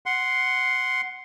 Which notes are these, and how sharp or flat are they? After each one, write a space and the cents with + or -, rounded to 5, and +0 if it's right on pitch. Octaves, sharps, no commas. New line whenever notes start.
F#5 +0 C6 +0